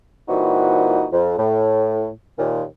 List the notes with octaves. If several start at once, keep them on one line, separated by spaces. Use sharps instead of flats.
A#2 E3 G3 C4 D#4 F#4
F2
A2
D#2 A#2